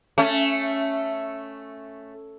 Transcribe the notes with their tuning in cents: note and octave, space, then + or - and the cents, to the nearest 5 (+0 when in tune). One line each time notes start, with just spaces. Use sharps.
A3 +0 C#4 +0